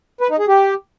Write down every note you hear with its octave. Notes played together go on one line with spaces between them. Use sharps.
B4
D#4
G#4
G4